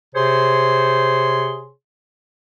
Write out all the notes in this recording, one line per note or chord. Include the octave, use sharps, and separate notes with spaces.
C3 G#4 C5 C#5 C6